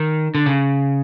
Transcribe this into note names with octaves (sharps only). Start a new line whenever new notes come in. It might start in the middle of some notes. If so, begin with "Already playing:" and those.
Already playing: D#3
D3
C#3